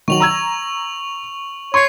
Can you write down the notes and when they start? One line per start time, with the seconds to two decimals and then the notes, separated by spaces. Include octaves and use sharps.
0.08 D#3 F#3 C#6 F7 F#7
0.20 A#5 E6 G#6
1.74 C#5 C6 C#6 C7